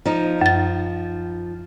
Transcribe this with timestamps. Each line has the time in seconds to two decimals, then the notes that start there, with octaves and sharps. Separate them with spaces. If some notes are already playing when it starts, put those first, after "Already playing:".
0.06 F3 D#4
0.41 F#2 A6